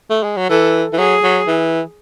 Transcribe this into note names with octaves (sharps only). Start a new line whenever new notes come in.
A3
G#3
F#3
E3 A4
E3
F#3 G#4
F#3
E3